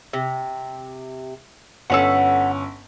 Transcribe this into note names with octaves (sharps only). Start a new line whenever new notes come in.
C3
G1 C#4 A4 B4 F#5 E6